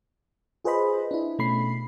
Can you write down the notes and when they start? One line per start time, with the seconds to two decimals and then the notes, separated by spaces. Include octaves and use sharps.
0.64 F4 G#4 B4 C5 D#5 B5
1.11 D4 E4
1.39 B2 A3 C#4 B5 C7